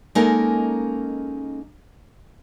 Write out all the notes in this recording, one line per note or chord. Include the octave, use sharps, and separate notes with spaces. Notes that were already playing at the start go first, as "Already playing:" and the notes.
G#3 A#3 C#4 D#4 A4 A#4